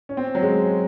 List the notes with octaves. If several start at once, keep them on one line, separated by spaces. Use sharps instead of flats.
C#4
C4
F#3
G#3